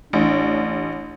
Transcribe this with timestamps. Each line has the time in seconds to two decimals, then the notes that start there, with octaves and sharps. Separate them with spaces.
0.13 A1 D4